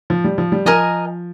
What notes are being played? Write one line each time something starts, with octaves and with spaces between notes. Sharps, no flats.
F3
G3
F3
G3
F3 A#4 D#5 G#5